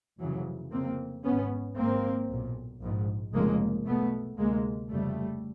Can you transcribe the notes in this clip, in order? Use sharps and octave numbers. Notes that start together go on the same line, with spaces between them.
F1 F2 C#3 E3 F#3
F1 F2 C#3 A#3 C4
G#1 G#2 B3 C#4
G#1 G#2 A#3 C4
B1 A#2
A#1 G#2
F1 F2 C#3 G#3 A#3
B1 B2 A3 B3
D2 C3 G#3 A#3
F1 F2 C#3 G3 A3